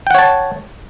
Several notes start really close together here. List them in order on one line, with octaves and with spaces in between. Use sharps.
G5 F#5 C#5 A5